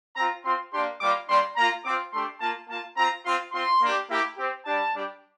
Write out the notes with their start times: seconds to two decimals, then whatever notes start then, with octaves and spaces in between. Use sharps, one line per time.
0.16 C4 F4 A#5
0.44 C4 F4 C6
0.72 A#3 D4 G4 C6
1.00 G3 A#3 F4 D6
1.28 G3 A#3 D4 C6
1.56 A#3 F4 A#5
1.85 C4 F4 D6
2.13 A3 D4 G4 C6
2.40 A#3 F4 A5
2.69 A#3 F4 A5
2.97 C4 F4 A#5
3.25 C4 F4 C6
3.53 C4 F4 C6
3.81 A#3 D4 G4
4.09 A#3 E4 G4
4.37 C4 G4
4.65 G3 D4 G4 A5
4.94 G3 D4 G4